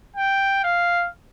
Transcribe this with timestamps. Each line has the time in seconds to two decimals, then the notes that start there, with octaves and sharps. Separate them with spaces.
0.16 G5
0.64 F5